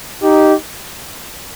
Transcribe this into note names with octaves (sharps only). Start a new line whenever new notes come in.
D#4 G4